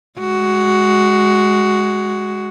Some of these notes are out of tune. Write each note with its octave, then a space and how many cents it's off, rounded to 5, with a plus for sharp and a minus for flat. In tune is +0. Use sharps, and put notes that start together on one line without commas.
G#3 +0 F#4 +10